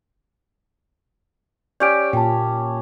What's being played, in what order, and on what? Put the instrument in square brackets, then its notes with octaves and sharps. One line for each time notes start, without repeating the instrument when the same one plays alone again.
[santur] C#4 G4 [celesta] D5 G6 D7
[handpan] A#2 [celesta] G5 A5